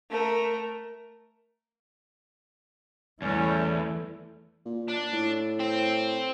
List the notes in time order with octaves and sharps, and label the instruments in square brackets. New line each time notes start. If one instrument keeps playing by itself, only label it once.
[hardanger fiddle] A3 A#4
[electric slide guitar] E2 [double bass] E3 A3 [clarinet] G3 [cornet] C#4
[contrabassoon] A#2
[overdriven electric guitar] D4
[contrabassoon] A2
[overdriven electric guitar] C4